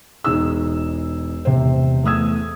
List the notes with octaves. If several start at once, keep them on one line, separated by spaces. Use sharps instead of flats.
E1 D#4 G#4 E6
E1 C3 C5
E2 A3 D#6 E6 G#6